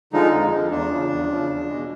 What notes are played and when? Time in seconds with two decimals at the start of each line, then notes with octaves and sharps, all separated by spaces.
0.13 D3 F3 G#3 D#4
0.32 F2
0.51 D3 F3 G#3
0.71 E2 D4
0.91 C#3 F3
1.10 E2
1.30 C#3 F3
1.50 E2
1.68 B2 G#3